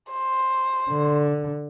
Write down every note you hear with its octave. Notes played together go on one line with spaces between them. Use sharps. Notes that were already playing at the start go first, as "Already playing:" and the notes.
C5
D3